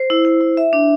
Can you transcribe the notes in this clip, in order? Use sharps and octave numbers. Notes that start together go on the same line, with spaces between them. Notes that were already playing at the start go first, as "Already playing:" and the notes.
Already playing: C5
E4
E4
E4
E5
D4